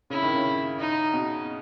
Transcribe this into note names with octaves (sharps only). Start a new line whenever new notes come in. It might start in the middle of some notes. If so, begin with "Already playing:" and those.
C#3 E4
D#3
C#3
D#4
B2